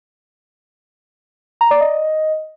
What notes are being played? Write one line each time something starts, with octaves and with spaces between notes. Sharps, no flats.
A#5
D5
D#5